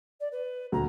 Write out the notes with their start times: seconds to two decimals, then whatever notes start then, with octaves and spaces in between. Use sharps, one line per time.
0.20 D5
0.31 B4
0.72 D#1 D2 A#5